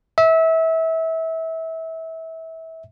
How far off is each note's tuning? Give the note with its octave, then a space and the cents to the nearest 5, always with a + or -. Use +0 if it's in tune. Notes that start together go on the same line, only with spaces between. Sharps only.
E5 -25